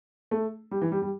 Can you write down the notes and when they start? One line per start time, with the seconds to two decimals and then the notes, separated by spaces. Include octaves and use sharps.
0.31 A3
0.71 G3
0.81 E3
0.92 G3
1.02 G3